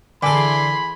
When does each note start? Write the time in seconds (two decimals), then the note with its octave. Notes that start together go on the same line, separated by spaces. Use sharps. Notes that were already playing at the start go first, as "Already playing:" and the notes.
0.23 D3 E3 G#4 A4 G#5 B5 C6 D6